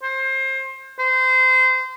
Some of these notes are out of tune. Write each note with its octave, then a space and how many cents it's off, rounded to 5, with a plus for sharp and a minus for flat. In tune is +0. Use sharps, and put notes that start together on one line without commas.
C5 +25
C5 -25